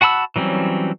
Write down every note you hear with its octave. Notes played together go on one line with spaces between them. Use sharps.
F#4 F#5 A5 B5 E6
E3 F#3 G3 C4 C#4